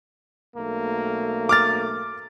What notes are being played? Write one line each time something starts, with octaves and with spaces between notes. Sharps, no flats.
B1 A3 A#3
D6 F6 A6